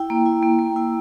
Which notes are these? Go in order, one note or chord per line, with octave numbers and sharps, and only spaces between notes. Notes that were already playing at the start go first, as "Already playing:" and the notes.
Already playing: E4 G5
A#3
E4
A#3
A#3
E4